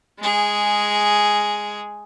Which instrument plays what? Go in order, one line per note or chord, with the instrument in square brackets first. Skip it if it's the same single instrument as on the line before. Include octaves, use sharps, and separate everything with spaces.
[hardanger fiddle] G#3 G#4